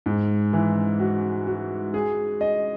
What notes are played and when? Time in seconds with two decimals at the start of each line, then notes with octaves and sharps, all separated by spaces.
0.06 G#2
0.53 E3
1.00 F#4
1.47 F#4
1.94 G#4
2.41 D#5